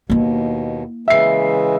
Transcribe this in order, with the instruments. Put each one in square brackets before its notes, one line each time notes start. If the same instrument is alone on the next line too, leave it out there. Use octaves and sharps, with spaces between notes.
[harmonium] D#2 B2 [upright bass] A#3 E4
[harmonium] C#3 E3 G#3 [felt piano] E5 C7